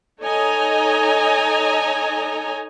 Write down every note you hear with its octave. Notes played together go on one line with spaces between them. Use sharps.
D#4 A4 C#5 D#5 G#5 A#5